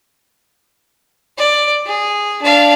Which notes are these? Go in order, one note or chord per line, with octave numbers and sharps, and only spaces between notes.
D5
G#4
D4 F5